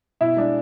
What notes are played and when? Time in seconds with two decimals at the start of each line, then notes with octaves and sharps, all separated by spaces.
0.21 B2 E4 E5
0.36 G#3 D4